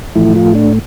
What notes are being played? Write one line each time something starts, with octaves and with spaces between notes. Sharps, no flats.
A2 E3 F3 A3 E4
F3 F4
D4